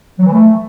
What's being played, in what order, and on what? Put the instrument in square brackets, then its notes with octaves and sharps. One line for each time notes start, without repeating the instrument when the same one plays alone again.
[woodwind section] F#3
E3
A3